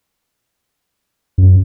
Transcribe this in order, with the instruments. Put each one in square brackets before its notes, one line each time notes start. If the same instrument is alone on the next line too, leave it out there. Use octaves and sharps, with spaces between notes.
[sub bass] F#2